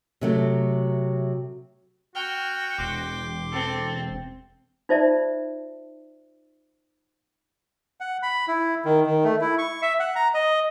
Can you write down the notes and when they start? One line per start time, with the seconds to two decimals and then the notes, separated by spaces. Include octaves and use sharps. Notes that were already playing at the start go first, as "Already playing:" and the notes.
0.21 C3 F#3 A3
2.15 F#4 G5 F6
2.78 E1 C6 D6
3.52 C4 A4
4.89 D#4 F4 C5 D5 E5 A5
8.00 F#5
8.23 B5
8.48 E4
8.85 D#3
9.06 D#3
9.24 A3
9.41 E4
9.58 C#6
9.82 E5
10.00 F#5
10.16 A#5
10.34 D#5